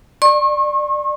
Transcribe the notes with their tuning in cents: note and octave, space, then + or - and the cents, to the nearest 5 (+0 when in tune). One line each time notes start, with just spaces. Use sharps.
D5 +20 C#6 -45